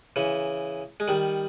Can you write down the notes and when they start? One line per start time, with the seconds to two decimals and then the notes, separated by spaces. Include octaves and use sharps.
0.16 C#3 E3
1.00 G#3
1.08 D#3 G3